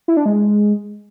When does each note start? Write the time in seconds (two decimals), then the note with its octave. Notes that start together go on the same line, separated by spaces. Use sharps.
0.08 E4
0.17 D4
0.26 G#3